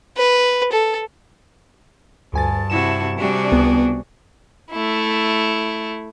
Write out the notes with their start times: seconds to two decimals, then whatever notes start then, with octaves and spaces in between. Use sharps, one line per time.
0.17 B4
0.72 A4
2.33 D2 G2 G#5 A5 A6
2.70 C3 E4 F#4 E7
3.18 C3 G3 D4 F#4 G#4
3.52 C#2 B3
4.71 A3 E4